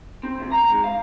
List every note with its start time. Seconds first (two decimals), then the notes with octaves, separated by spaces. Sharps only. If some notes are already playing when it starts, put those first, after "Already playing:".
0.23 C4
0.40 D2
0.51 A#5
0.70 G#2
0.84 F5